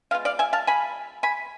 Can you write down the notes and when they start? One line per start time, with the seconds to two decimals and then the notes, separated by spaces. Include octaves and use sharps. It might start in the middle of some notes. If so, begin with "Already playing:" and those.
0.11 G#3 B3 F4 F5
0.25 D5 F5
0.39 E5 G#5
0.53 F5 A5
0.67 G#5 B5
1.23 G#5 B5